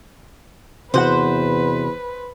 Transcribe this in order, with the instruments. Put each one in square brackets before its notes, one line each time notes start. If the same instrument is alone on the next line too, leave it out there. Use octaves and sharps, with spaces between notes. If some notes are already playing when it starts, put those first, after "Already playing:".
[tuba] E2 [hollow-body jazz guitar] C3 F#4 F#5 [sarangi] B4 [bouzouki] C5